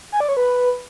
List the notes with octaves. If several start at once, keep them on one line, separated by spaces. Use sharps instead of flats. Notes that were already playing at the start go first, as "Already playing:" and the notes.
G#5
D5
C#5
B4